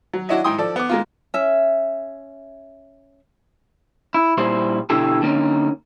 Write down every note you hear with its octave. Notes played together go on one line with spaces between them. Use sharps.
F#3
D4 E4 F#4 C#5 D#5 E5
G#2 D#4 E4 G5 C6 D#6
F3 A4 D5
B3 D6
G#3 A#3 F4
C#4 E5
E4
A#2 G3 E4 C5
B2 D3 E4 G4 A4
D3 A#3 C#4 D#4